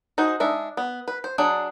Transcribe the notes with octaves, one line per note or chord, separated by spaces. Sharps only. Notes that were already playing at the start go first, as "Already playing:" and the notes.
D#4 F#4 G#4 C5
G#3 D4 D#4 E5
B3
B4
C5
F#3 D4 G#4